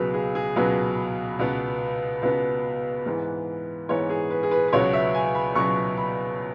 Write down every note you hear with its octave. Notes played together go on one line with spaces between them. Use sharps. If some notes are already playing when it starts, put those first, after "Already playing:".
Already playing: C#2 B2 F#3 G#4 B4
G#4
G#4
C#2 B2 F#3 B4
C#2 B2 B3
C#2 B2 B3 B4
G#2 E3 B3
G#2 E3 B3 C#5
G#4
B4
G#4
B4
B4
C#2 B2 F#3 B3 C#5
E5
G#5
B5
C#2 B2 F#3 B3 C#6
B5